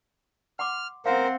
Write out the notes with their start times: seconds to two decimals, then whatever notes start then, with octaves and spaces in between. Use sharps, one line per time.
0.59 F#5 C6 D6 F6
1.06 C4 A#4 C5 F5 F#5